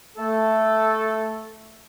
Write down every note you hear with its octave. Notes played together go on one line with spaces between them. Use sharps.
A3 A4